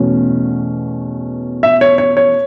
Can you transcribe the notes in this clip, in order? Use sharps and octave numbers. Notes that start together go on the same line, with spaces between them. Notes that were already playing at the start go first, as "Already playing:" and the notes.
Already playing: E2 B2 A3 C#4
E5
C#5
C#5
C#5